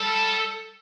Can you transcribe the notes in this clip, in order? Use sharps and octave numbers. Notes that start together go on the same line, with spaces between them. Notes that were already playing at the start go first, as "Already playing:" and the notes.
Already playing: G3 A4